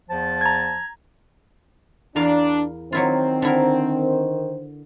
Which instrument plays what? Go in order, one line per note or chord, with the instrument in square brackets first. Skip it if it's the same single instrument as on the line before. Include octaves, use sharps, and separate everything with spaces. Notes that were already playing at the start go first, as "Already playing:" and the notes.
[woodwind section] E2 F3 A5
[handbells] A#5 G#6
[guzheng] E2 A#4 F5 [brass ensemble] D4
[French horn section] D#3 C5 [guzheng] F#3 E4 F4 [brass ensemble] C4
[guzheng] D3 E4 A#4